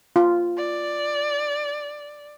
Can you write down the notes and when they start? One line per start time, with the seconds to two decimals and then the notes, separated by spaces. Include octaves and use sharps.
0.16 F4
0.58 D5